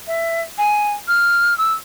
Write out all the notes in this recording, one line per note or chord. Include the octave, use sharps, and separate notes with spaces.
E5
G#5
F6
E6